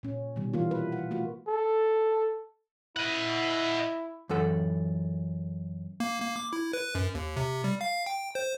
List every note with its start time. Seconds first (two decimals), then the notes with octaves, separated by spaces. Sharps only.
0.03 A#2 C#4
0.36 B2 D#3 G3
0.53 E3 A#3 F4
0.71 B4
0.92 F#5
1.11 A3 A#3 F4 F#4
1.48 A4
2.97 E4 D#5 F#5
4.29 F#2 E3 A4 F#5
6.00 A#3
6.21 A#3
6.36 D6
6.53 E4
6.73 B4
6.95 F#2
7.15 D#2
7.36 C3
7.64 G3
7.81 F5
8.06 G5
8.35 C5